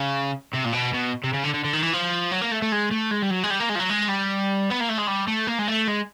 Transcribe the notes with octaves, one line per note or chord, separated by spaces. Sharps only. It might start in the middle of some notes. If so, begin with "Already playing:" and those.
Already playing: C#3
C3
A#2
B2
B2
C3
C#3
D3
D3
D3
D#3
E3
F3
F#3
A#3
A3
A3
G#3
A3
G#3
G3
F#3
G#3
G3
A#3
G#3
F3
F#3
G#3
G3
B3
A#3
A3
G#3
G3
A3
A#3
G#3
A3
G#3